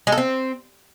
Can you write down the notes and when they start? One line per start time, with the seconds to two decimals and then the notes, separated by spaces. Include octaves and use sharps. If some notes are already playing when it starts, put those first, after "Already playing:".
0.07 G#3
0.12 A4
0.18 C4